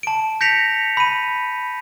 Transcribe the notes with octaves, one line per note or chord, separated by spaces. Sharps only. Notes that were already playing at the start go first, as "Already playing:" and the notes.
A5 D7
G6 A#6 B6 C#7 D7 F7
B5 D#7